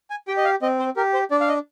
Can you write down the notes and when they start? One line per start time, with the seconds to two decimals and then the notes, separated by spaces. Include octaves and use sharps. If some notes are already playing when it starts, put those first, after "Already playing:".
0.10 G#5
0.28 G4 G5
0.37 D#5
0.45 F5
0.62 C4 D#5
0.79 C5
0.96 G4 A#4
1.14 C5
1.31 D4 D5
1.41 F5
1.48 D#5